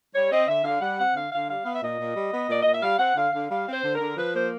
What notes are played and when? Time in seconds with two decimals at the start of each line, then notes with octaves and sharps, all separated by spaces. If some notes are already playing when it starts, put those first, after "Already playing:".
0.15 G3 C#5
0.31 C4 D#5
0.48 D3 E5
0.64 D3 F5
0.81 G3 F#5
0.98 C4 F#5
1.14 D3 F5
1.32 D3 F5
1.48 G3 F5
1.64 B3 F5
1.73 E5
1.81 A#2 D#5
1.99 A#2
2.15 G3
2.33 B3
2.49 A#2 D5
2.62 A#2 D#5
2.73 E5
2.82 G3 F5
2.99 C4 F#5
3.16 D3 F5
3.33 D3 F5
3.50 G3 F5
3.67 C4 C5
3.83 D3
3.94 A#4
4.00 D3
4.17 F3 B4
4.33 A#3 C5